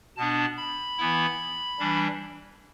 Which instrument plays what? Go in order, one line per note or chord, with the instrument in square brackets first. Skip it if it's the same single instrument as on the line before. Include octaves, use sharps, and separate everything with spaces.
[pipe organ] B2 B3 D4 A5
B5
E3 B3 E4
E3 G3 D4